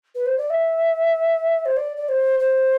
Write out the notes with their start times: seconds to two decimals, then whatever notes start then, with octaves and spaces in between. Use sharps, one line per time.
0.15 B4
0.26 C5
0.37 D5
0.50 E5
1.65 C5
1.76 D5
1.96 D5
2.08 C5
2.39 C5